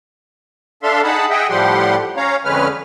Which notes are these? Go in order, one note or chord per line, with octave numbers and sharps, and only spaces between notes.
D4 A4 E5 F5 C6
D#4 G#4 F#5 A5 B5
G#4 D#5 E5 F#5 G5
A2 F3 G3 G4 F#5 C6
C#4 C#5 F5 A#5
F2 D3 G#3 C#4 B4 F6